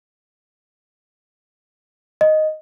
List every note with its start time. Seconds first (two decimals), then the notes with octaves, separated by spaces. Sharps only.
2.21 D#5